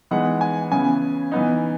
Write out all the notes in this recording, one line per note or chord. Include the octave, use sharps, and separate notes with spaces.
E3 G#3 B3 D#4 F#5
G#5
C#3 E3 B3 G#5
E3 B3 D#4